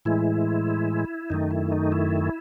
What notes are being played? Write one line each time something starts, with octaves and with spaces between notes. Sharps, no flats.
A2 E3 G#3 E4
F#2 D#3 A3 D#4
E4
D#4
E4